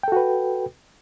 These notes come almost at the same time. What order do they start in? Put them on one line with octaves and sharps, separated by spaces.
G5 A4 F#4 B4